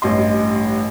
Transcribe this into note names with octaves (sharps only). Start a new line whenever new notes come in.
A1 G2 D#5 C6